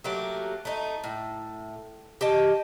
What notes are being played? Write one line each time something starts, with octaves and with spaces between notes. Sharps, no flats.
F#3 A3 A#3 G4
A3 D#4
A2
G4 D#5 A5